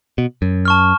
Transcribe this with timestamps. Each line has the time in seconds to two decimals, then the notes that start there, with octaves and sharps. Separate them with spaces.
0.18 B2
0.42 F#2
0.65 A5 C#6 F6